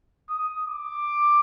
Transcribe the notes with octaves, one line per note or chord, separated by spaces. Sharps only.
D#6
D6